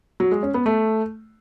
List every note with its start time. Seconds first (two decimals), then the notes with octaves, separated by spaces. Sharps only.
0.20 F#3
0.31 G#3
0.43 C#4
0.54 B3
0.66 A3